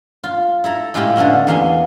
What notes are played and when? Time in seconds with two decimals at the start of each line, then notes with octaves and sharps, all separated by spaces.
0.24 F4
0.64 E4 A4 A#5
0.94 A2 G#3 E4 F4 G4 B5
1.16 D3 A3 B3 C#4 E4
1.47 E2 A#3 B3 G#4 G#5 C6